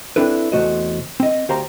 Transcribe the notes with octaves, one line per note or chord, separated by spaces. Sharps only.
C4 D4 E4 A4 B4
E2 C3 A3 F#4 C5 D#5
C4 D#5
D2 G4 C5 F5 A#5